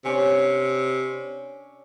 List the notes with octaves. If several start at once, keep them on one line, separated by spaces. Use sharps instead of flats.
C3 C#4 D4 C#5